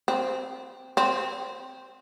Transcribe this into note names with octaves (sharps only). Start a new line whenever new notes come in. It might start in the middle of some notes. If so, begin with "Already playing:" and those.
C4
C4